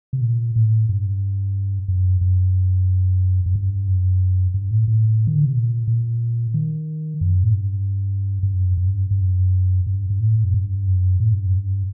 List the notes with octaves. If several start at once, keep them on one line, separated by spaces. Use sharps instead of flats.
C3
A#2
A2
G2
F#2
F#2
F#2
G2
F#2
G2
A2
A2
D#3
D3
C3
A#2
A#2
D#3
F#2
A2
G2
G2
F#2
F#2
G2
G2
F#2
G2
G2
A2
F#2
G2
F#2
A2
G2
F#2
G2